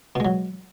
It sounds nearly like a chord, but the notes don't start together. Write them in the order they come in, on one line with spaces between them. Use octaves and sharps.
B2 G#3 F#3